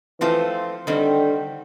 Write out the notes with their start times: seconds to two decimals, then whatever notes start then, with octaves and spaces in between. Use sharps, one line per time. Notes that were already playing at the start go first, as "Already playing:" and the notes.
0.20 E3 F3 A3 C4 F4
0.87 D3 D#3 G3 C4